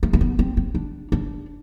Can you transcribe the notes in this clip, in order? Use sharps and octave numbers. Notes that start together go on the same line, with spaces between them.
A3
A3
B3
C4
C4
D4
D4